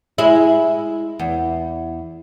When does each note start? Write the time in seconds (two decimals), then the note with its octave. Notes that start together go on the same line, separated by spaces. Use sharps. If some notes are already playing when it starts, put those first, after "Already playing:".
0.18 G#3 E4
1.19 E2